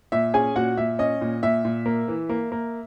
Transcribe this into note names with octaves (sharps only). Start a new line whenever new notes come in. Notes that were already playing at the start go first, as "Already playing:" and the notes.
A#2 E5
C#4 G#4 G#5
A#2 F#4 F#5
A#2 E5
C#4 D#5
A#2
A#2 E5
A#2
A#3
E3
A#3
A#3